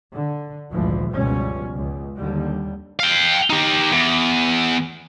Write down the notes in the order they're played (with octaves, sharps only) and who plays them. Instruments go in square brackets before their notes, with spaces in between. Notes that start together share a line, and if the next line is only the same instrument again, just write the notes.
[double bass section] D3
G#1 D2 A#2 E3 F3
G1 C#2 B2 F3 G3 C#4
C#2
D#2 D3 G3
[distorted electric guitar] F5 G5
D#4 G4
E2